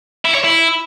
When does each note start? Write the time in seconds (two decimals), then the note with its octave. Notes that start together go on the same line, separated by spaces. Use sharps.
0.25 E4
0.34 C#5
0.44 E4